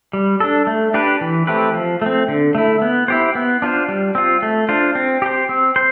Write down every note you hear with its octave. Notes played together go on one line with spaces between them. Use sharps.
G3
D4 A4
A3
D4 G4 B4
E3
A3 C4 G4 B4
F3
A3 C4
D3
A3 E4
B3
E4 G4 C5
B3
D4 F4 C5
G3
C4 F4
A3
D4 F4 C5
C4
G4 C5
C4
C5